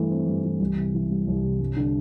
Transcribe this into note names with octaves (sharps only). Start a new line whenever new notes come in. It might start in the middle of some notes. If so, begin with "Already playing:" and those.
Already playing: G2 E3 A3
C4
G2
E3
C2
C3
E3
G3
C2
C3
G2
D3